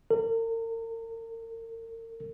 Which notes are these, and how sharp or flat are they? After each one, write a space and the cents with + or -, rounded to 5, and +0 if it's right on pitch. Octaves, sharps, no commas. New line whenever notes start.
A#4 -40